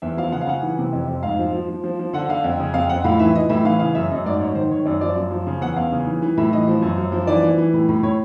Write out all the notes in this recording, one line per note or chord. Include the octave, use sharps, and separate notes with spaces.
E2 E5
F3 F5
C#3 F#5
F5
C#3 F#5
E3
C3
F2
F2
G#2 F5
F3
F3
F3
F3
F3
D3 F#5
D3 F5
F2
C#3
F2 F5
F2 F#5
A2 F5
E3 E5
E3 D#5
A2 E5
E3 F5
C#3 F5
F#2 E5
F#2 D#5
G#2 D5
G#2 C#5
D#3 C5
D#3 C#5
F#2 D5
F3 D5
F#2
F3
C#3
E2 F#5
E2 F5
C#3
E3
E3
A2 E5
E3 D#5
F3
F#2
F#2
F3
E3 D5
E3
E3
A2
A2
A2 C#5